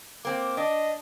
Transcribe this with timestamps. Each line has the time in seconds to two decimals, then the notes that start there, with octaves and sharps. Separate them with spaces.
0.25 A#3 C4 D6
0.57 D4 D#5